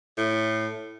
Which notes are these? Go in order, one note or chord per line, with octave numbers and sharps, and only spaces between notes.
A2